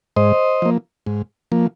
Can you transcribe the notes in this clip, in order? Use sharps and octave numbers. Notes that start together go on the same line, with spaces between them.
G#2 C5 D#5
F3 A#3
G#2
F3 A#3